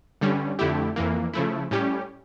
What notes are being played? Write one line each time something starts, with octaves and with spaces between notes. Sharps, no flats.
G2 D3 G3 C#4
F2 D3 A3 E4 G4
F2 E3 A#3
C#3 F3 A3 E4
A2 G3 C#4 G4